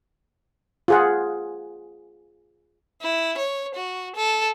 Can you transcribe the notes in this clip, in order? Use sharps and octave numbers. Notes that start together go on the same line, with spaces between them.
F4 G#4 F#5
E4
C#5
F#4
A4